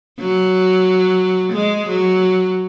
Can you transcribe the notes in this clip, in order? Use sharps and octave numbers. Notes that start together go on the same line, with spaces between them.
F#3
G#3
F#3